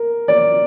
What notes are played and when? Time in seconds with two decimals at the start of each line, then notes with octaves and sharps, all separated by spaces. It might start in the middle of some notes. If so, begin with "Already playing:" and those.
Already playing: A#4
0.28 D5